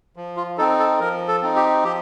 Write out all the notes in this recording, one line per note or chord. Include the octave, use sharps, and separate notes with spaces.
F3
F4
C4 D#4 A4
A4
F3 A#4
A4
C4 D#4
G4
F3 G4